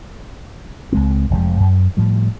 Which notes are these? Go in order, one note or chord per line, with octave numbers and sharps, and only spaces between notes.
C#2 G#3 C4
F1 F2 F3 G#3
F#2
A2 F3 G3